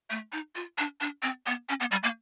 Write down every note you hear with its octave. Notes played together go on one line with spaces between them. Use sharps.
A3
D#4
F4
D4
D4
C4
B3
C#4
B3
G3
A#3